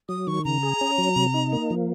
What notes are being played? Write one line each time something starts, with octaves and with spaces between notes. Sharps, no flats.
F#3 D#6
D#3 C#6
C#3 A#5
G#4
C#4
F#3
C3
D#4
A#3
F3